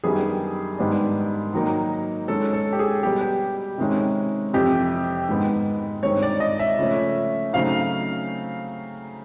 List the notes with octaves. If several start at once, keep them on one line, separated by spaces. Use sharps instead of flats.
F#2 D#3 G3 B3 D4 G#4
G#2 D#3 G3 B3 D4
D#3 F#3 A#3 D#4
D#3 G#3 C#4 A4
A4
G4
G#4
B2 G3 B3 G4
G4
C3 D#3 G#3 C#4
F2 C3 E3 G4
G#2 D#3 G#3 B3
G2 D#3 G#3 C4 C#5
D5
D#5
E5
C#3 F3 A3 C#4
C#3 F#3 A3 C4 D#4 F5